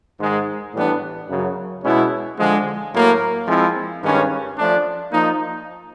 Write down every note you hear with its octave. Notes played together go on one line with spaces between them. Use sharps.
G#2 D#3 G#3
A2 E3 G3 B3 D4
F#2 C#3 F#3
B2 G#3 C#4 E4
D3 F3 G#3
A2 F#3 A#3
F3 G#3 C4 E4
G2 D#3 G#3 C#4
F3 A3 D4
F3 A#3 D#4